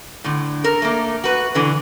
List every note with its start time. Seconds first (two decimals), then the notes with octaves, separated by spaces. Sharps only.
0.24 A2 D3
0.64 A4 A#4
0.82 A3 A#3
1.24 F#4 B4
1.55 B2 D3 E3